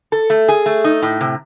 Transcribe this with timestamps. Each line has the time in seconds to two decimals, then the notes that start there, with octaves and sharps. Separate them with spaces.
0.12 A4
0.30 A3
0.48 G#4
0.66 A3
0.84 D#4
1.02 A2
1.21 C3